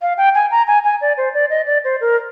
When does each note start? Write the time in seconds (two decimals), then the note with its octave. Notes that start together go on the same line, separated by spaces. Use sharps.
0.02 F5
0.18 G5
0.35 G#5
0.51 A#5
0.67 G#5
0.84 G#5
1.01 D5
1.17 C5
1.34 D5
1.50 D#5
1.67 D5
1.84 C5
2.01 A#4